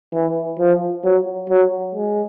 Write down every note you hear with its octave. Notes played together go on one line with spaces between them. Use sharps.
E3
F3
F#3
F#3
G#3